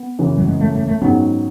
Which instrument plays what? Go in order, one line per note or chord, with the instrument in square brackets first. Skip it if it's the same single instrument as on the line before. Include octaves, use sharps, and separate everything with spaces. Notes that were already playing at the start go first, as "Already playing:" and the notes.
Already playing: [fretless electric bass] B3
[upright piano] F#1 F#2 E3
[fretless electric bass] F#3
G#3
A3
A3
A3
[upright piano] G#2 D#3 F#3 C#4 [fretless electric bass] B3